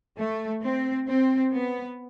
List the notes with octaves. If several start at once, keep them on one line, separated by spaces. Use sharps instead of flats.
A3
C4
C4
B3